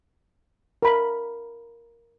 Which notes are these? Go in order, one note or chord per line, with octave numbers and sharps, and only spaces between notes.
A#4 B5